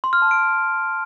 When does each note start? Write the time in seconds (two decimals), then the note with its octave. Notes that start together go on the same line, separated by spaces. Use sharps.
0.04 C6
0.13 F6
0.22 A5
0.31 D7